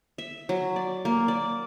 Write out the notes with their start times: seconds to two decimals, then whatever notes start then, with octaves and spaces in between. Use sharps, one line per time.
0.18 E5
0.49 F#3
0.76 D5
1.05 A#3
1.28 D5